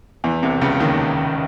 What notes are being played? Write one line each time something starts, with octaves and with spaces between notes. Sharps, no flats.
E2 E3
C2 C3
C#2 C#3
D#2 D#3